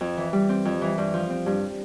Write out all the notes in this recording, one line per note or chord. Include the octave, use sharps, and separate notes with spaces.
F2
E3
G3
C4
F2
E3
G2
F3
C4
G2